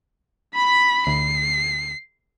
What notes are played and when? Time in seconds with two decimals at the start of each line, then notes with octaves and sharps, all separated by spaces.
0.55 B5 B6
1.07 D2 C7